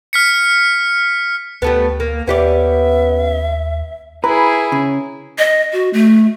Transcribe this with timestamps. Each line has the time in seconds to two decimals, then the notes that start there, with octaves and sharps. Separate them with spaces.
0.13 F6 B6 C#7
1.62 D2 G3 A3 B3
2.00 A#3
2.27 D#2 B3 C#4 G4 D5 E5
4.24 E4 G#4 B4 A#5 B5
4.72 C#3
5.38 D#5
5.73 F#4
5.93 A3